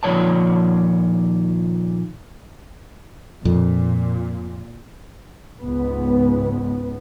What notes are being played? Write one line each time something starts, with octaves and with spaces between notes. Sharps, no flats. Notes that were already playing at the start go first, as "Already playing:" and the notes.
A#2 D#3 F3 C#5 D5 A5
F2 A#2
C#2 G#2 B3